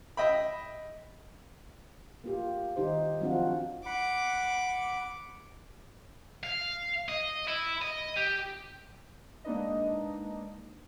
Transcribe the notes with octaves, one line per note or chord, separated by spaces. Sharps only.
D#5 E5 G5 B5
A#3 F4 G4
D#3 D#4 G4 C5
F3 F#3 C4 D4 F4 F#4
F#5 B5 D6
F5
D#5
E4
D#5
G4
G#3 A#3 D4 D#4 B4 D#5